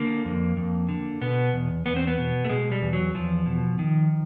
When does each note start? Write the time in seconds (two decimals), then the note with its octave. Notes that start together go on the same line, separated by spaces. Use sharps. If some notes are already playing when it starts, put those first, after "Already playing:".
Already playing: D3 A#3
0.25 F2
0.56 F2
0.89 D3
1.21 B2 B3
1.53 E2
1.86 E2 B3
1.96 C4
2.07 B3
2.18 B2
2.45 A3
2.49 B2 G#3
2.72 G3
2.82 E2
2.93 F#3
3.14 E2 F3
3.46 B2
3.79 D#3